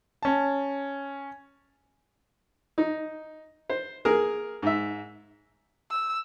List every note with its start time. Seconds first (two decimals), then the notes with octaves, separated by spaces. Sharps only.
0.23 C#4 A5
2.78 D#4
3.70 C5
4.05 A#3 G#4 A#4
4.63 G#2 E5
5.91 E6